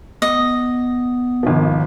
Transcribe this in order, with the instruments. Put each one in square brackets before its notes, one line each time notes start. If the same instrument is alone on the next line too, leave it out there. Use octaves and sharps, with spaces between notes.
[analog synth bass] B3 [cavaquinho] D#5
[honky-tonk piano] G#1 D#3 F3